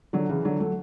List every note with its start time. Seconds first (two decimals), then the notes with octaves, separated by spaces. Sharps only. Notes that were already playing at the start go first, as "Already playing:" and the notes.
0.13 D3 F#3
0.29 C#3 E3
0.45 D3 F#3
0.60 F#3 A3